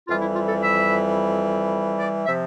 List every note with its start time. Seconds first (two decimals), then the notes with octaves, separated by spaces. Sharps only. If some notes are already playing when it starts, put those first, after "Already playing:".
0.08 F2 E3 G3 F4
0.21 E4
0.35 F4
0.49 A4
0.62 E5
1.98 D5
2.26 C3 F3 E5